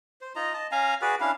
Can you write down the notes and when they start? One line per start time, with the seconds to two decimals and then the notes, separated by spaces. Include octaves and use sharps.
0.21 C5
0.36 D#4 F4 D#5 A#5
0.53 D#5 A5
0.72 C#4 F5 G#5 A#5
1.02 F#4 G#4 B4 D5
1.21 C#4 D4 E4 F5